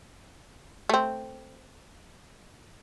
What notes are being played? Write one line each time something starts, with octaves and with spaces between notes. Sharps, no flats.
A3 C4